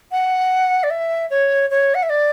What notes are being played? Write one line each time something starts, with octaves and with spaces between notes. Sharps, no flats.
F#5
D5
E5
C#5
C#5
F#5
E5
D5